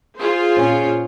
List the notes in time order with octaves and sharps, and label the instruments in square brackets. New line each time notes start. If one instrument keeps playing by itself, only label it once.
[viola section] F4 G#4 C5
[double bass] A#2 C#4